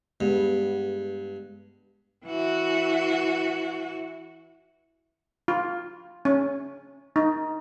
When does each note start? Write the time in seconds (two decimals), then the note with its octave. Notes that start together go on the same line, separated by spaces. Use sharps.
0.20 G2 G#3 B3
2.26 E3 F#4
5.48 F4
6.25 C#4
7.16 D#4